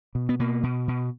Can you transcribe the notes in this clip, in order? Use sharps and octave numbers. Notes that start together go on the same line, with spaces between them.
B2
B3
B2 A#3
B2
B2